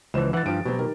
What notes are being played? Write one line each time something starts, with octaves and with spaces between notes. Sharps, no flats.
C#2 E3 F3 C5 E7
E3 E4 F#5 A6
G2 F3 D7
B2 F#3 C4 G4
D#3 G4 A#4